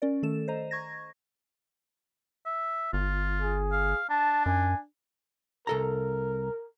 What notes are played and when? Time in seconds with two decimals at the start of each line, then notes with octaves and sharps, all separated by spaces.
0.02 C#4 A#4 D5
0.23 D#3 A3 A4 E7
0.48 C5 D#5 A#5
0.71 C#6 G#6 A#6
2.46 E5
2.93 G1 F4
3.42 G#4
3.72 F5
4.10 D4 A5
4.46 F#2 G#5
5.67 C2 A4 A#4 A#5